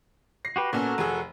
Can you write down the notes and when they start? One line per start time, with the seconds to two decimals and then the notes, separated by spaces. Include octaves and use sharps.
0.45 A#6 C7
0.56 F#4 G4 B4
0.73 A#2 B3 C#4 F#4 A4 A#4
0.98 F1 G#4